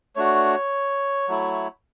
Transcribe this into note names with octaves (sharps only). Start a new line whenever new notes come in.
A3 D4 F#4 C#5
F#3 A3 E4